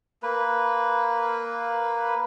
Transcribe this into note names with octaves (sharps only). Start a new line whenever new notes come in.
A#3 B4